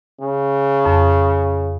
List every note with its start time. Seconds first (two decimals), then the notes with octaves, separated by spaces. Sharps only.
0.21 C#3
0.85 F2